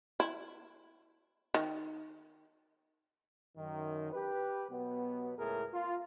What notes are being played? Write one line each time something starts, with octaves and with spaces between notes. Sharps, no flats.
E4
D#3
F#2 D#3
G4 B4
B2 F#3 B3
C#2 A2 A3 G#4 A#4
F4